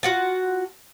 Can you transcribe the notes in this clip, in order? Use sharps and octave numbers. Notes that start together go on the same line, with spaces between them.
F4 F#4 F#5 A5